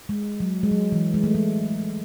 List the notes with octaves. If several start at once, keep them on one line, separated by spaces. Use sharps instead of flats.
G#3
F#3
G#3
F#3
E3
G#3
A3
G#3